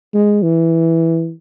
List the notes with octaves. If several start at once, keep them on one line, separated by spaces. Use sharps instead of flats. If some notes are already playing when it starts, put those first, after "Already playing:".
G#3
E3